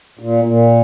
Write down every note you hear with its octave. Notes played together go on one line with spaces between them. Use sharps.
A#2
A#2